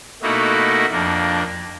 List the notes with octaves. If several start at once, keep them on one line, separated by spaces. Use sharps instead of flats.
B2 A3 A#3 D#4 E4 F#4
F2 A#3 D4